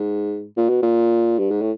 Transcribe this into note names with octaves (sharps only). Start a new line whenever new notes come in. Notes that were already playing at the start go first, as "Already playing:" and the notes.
Already playing: G#2
A#2
B2
A#2
G2
G#2
A2